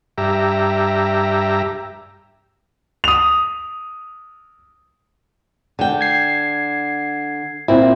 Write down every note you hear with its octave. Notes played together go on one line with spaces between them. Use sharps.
G2 G4 E5 A#5
D#6 F7
D3 G5
G#6 C7
A#2 C4 E4